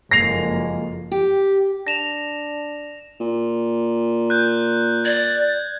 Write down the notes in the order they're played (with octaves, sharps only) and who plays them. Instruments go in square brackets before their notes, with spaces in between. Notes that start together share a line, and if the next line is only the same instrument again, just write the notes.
[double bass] F#1 F2 [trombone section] G#3 A#3 [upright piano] A#6 C7 F7
[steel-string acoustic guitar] G4
[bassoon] D4 [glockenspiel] A#6 E7 F7
[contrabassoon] A#2
[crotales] F#6 G6
[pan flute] D5 [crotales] G#6